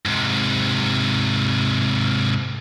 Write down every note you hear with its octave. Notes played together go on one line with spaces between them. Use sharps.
G#2 C3